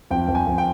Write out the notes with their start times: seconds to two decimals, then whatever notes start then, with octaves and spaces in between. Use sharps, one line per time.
0.11 F2 G5
0.28 F2
0.35 G#5
0.47 F2
0.58 G5